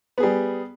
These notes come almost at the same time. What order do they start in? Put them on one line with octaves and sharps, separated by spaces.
B3 G#4 G3